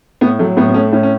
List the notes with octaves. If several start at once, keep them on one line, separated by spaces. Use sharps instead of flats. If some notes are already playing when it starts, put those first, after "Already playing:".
A2 B3
F#3 A3
A2 B3
B3
A3 C#4
A2 C#4
C#4